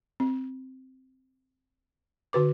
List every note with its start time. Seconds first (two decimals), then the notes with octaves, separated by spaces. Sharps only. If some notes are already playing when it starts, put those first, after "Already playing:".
0.20 C4
2.33 D3 F#4 B4 D6